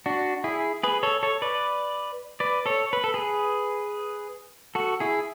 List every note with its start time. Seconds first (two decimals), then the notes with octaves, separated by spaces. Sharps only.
0.06 D4 F#4
0.44 E4 G#4
0.83 G#4 B4
1.03 A4 C#5
1.23 A4 C#5
1.42 B4 D5
2.40 B4 D5
2.66 A4 C#5
2.93 B4
3.04 A4
3.14 G#4 B4
4.75 F#4 A4
5.00 E4 G#4